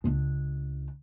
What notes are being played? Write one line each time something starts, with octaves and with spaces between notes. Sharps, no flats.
C#2 D4